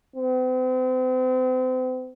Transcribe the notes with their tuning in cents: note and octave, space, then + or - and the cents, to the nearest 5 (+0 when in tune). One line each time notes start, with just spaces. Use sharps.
C4 -40